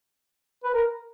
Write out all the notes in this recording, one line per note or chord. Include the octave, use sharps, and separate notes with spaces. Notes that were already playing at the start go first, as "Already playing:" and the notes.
B4
A#4